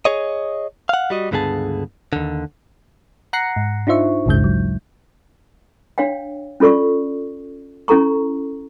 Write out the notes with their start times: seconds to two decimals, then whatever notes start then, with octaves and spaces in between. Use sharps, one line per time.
0.05 G#4 C#5 D#5
0.89 F5 F#5
1.10 G3 F#4 D#5
1.31 C#2 G2 D3 B3 G#4 A5
2.13 D#2 D3
3.33 F#5 A#5 F#6 A#6 C7 C#7
3.56 G#2
3.87 D4 D#4 F4 C5 E5 C#6
4.26 A#1 D#2 G#2 C#3 G#3 G6
4.44 F#3
5.98 D4 C#5 F5 G5
6.60 C#4 F4 A4 D5 C#6
7.88 C#4 E4 A4 A#5 C#6